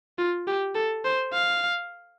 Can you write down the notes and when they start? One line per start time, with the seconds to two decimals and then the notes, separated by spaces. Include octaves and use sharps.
0.18 F4
0.47 G4
0.75 A4
1.05 C5
1.33 F5